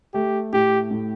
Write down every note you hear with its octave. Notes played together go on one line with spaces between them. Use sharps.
A3 G4
A2 G4
A2